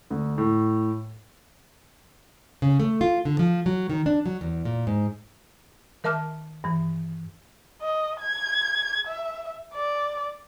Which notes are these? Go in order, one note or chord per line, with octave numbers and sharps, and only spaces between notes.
D2
A2
C#3
A3
F4
D3
F3
F#3
D#3
D4
F#3
E2
A#2
G#2
D#3 A#4 E5 A5 D6 F6
G2 E3
D#5
G#6
E5
D5